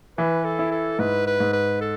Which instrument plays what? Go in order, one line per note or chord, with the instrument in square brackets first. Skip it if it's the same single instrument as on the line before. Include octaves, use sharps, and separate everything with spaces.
[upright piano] E3 [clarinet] B4
[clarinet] A4
[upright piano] E4
[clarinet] A4
[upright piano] G#2 [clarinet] B4
[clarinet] B4
[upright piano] G#2
[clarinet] B4
A4